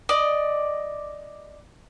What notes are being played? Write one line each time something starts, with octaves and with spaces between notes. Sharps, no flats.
D5 D#5